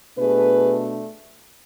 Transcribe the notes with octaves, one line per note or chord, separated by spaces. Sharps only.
B2 A3 D4 G#4 B4